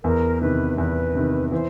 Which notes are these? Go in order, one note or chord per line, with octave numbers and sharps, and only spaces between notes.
E2 A#4
C3 D#3 B4
E2 B4
C3 D#3
E3 C5